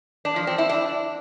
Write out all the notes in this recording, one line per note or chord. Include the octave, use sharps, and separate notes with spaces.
D4
F3
C4
E4
D4